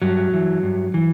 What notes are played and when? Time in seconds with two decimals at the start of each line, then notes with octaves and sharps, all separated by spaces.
0.02 G2 F#3
0.33 E3
0.63 G2
0.94 E3